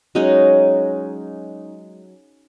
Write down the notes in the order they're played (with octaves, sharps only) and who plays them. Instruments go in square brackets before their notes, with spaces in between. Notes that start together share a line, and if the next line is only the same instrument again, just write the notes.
[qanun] F#3 G#3 C#4 D#4